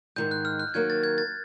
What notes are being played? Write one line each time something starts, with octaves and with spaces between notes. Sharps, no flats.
G#2 D#3 G#3 G6
F#6
F6
F#6
D#3 F#3 A#3 G#6
A6
G#6
A6